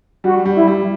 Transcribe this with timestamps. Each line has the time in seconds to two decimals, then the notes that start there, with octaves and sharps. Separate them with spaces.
0.24 G3 F#4
0.45 G3
0.56 E4
0.68 G3